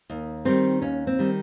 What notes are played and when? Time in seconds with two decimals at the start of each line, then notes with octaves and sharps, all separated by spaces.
0.10 D#2
0.45 D#3 G3 C4
0.82 D#2 C#4
1.07 C4
1.19 D#3 G3